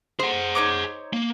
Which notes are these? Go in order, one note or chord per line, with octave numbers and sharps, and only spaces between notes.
G#4 C5 F#5
D#4 C#5 D6
A#3